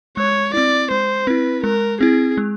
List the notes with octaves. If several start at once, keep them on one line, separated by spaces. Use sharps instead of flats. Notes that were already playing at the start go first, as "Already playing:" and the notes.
G#3 C#5
C4 E4 D5
G#3 C5
C4 E4 B4
G#3 A#4
C4 E4 G#4
G#3